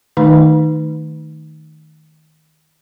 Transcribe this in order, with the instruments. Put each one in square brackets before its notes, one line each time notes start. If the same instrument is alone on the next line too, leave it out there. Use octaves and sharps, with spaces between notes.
[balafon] D#3 A3 D#4